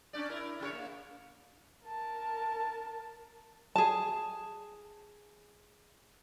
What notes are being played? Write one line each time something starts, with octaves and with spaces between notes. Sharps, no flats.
C#4 D4 D5
E4 A#4
C#3 G4 C#5
A#3
A#4 A5
G#4 A5